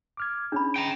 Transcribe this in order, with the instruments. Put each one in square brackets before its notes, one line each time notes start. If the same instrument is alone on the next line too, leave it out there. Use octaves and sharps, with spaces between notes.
[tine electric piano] D6 F6 G#6
[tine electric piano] C#4 G#4 [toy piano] D4 B5
[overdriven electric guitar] G5 A#5